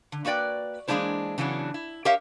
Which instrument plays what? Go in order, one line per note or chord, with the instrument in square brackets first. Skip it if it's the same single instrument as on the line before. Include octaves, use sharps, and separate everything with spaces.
[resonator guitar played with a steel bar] D3
A#3 F#4 B4 D5 G5
E3 G#3 A#3 D4 E4 C5
C#3 E3 F#3 B3 D4
E4
G4 A#4 C#5 E5 F5